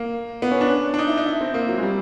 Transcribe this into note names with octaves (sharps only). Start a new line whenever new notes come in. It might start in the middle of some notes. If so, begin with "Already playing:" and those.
Already playing: A#3
B3
C#4
D4
D4
D#4
E4
D#4
E4
C4
A#3
F#3
G#3
G3